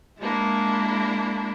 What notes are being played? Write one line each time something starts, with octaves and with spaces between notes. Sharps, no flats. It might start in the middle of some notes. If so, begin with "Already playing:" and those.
G#3 A#3 D4 E4